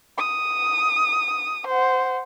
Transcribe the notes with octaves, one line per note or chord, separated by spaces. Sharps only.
D#6
C5 F#5